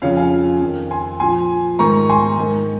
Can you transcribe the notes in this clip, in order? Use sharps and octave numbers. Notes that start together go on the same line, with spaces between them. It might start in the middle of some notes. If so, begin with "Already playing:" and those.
F2 C#3 F3 C#5 F5
F5 G#5
F2 D#3
G#5 C6
A#2 F3 G#5 C6
G#2 D#3 A#5 C#6
G#5 C6
G#2 D#3